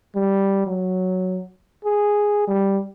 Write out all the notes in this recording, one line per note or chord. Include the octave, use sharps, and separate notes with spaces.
G3
F#3
G#4
G3